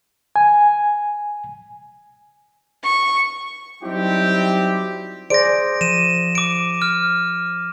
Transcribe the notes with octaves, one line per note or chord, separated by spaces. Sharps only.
G#5
C#6
F#3 G3 C4 D#4 E4 G4
G#4 C5 D5 A#6 D7
F3 D#7 E7
D6 D7
F6